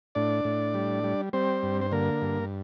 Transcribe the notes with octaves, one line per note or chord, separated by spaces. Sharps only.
A2 D4 D5
A2
G3
G3
G3 C4 C5
G2
C5
D3 A#3 A#4
G2